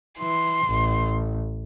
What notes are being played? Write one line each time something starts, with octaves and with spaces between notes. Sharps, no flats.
E3 C6
A1